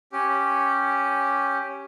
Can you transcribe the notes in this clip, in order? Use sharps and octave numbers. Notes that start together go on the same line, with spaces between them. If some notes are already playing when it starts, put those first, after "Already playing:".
C#4 G4